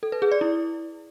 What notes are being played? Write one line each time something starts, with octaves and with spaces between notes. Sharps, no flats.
A4
B4
G#4
D5
E4